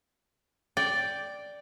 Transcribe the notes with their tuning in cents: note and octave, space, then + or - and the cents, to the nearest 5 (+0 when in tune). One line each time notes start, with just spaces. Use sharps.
D5 +0 G5 +0